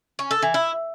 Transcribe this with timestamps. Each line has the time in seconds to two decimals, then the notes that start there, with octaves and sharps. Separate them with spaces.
0.19 C#4
0.31 A4
0.42 E3
0.54 E4